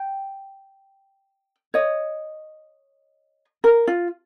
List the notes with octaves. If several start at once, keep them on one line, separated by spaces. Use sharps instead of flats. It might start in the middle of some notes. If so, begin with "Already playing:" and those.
Already playing: G5
C#5 D#5
A#4
F4